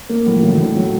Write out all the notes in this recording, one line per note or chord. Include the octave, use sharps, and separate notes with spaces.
A#3
A2 F#3
F3
E3 F#3
D#3
A2 D3
F#3